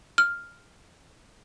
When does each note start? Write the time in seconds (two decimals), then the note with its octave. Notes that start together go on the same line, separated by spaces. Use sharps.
0.18 F6